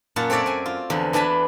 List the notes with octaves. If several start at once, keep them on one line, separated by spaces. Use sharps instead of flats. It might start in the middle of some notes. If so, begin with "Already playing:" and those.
F#2 A#2 F4 F#5 A5
C4 A4 C#5 D5 E5
C5 G#5
F4
E2 D3 F3
E3 D4 G#5 A5 B5